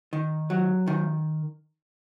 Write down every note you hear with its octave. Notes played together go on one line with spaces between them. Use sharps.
D#3
F#3
D#3